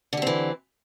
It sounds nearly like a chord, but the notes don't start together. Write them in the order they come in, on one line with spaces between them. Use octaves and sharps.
D3 G4 C4 E3